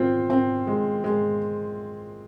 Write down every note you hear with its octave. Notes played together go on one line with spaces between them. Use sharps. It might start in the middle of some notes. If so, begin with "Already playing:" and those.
Already playing: C4 F4
C4
G#3
G#3